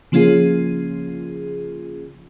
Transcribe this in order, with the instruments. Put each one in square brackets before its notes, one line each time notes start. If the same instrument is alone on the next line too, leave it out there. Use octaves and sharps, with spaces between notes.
[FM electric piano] C#3 F3 A#3 C#4 F4 G#4